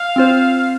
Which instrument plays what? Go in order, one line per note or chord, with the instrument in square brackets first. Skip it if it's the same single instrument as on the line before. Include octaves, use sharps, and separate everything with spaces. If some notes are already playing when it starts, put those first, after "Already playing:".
Already playing: [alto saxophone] F5
[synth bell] C4 F4 C5